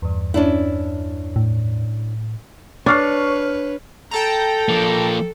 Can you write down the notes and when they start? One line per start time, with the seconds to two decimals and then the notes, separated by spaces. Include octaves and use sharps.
0.02 E2 G2
0.34 C#4 D4 E4
1.36 A2
2.86 D4 B4 C#5 C#6 F6 C7
4.11 A4 G5 A5 A#5
4.69 F3 A#3